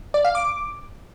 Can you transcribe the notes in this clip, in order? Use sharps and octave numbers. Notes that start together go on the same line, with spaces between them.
D5
F5
D6